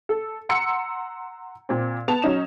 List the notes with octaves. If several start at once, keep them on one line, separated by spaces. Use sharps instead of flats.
A4
F#5 A#5 C6 E6 C#7
A#2 C4
B3 A5 F7
F#3 C#4 D#4 E7